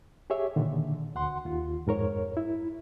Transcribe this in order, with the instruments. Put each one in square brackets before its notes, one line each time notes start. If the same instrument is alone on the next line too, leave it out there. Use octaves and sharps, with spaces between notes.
[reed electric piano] G4 G#4 C#5 E5
A#2 D3 D#3
D2 F#5 C6
D#2 F4
F2 G#2 A#4 C#5
E4